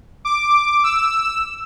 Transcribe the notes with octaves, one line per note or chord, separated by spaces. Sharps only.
D6
E6